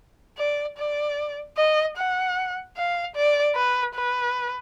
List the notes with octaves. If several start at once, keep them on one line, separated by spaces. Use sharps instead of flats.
D5
D5
D#5
F#5
F5
D5
B4
B4